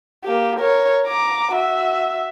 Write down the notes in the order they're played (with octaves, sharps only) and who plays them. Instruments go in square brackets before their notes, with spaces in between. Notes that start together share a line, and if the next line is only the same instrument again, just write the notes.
[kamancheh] A#3 G4
A#4 C#5
A#5 D6
F#4 E5